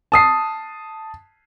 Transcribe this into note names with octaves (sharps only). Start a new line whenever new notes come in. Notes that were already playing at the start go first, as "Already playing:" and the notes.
A5 D#6 C7